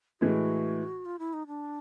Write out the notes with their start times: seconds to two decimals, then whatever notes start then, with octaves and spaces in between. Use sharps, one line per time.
0.21 A2 E3 G#3 F#4
1.06 F4
1.19 E4
1.33 D#4
1.47 D4